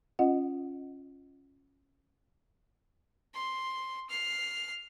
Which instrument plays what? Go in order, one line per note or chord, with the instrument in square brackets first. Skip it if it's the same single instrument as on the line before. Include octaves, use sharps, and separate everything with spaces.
[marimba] C#4 F4 D#5 F#5
[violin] C6
F6 C7